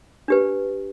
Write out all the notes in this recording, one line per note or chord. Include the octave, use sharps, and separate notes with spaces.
D4 G4 B4